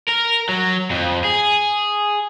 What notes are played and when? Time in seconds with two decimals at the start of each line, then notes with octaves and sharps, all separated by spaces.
0.09 A#4
0.49 F#3
0.91 F2
1.24 G#4